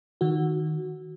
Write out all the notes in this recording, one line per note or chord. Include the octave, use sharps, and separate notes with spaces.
D#3 F#4